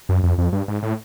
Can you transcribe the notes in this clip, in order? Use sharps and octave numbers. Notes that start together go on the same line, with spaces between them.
F#2
F2
F2
G2
G#2
A2